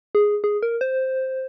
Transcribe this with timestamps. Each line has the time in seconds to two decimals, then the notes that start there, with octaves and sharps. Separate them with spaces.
0.15 G#4
0.44 G#4
0.63 A#4
0.81 C5